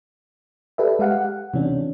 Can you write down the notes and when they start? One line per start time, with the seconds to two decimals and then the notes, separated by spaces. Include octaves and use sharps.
0.78 G4 A4 B4 D5 E5
0.99 G#3 G4 F5 F#5
1.21 F#5
1.54 C3 E3 C#4 D4